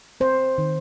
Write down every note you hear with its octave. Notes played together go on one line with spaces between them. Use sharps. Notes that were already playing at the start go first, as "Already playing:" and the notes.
C4 C5
D#3